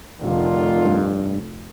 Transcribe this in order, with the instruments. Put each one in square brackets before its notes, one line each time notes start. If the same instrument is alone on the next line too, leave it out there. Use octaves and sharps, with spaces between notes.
[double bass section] F1 [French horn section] D3 D#3 F4
[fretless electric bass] G2